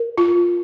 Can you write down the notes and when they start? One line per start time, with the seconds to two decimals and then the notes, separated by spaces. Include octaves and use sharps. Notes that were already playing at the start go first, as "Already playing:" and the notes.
Already playing: A#4
0.18 F4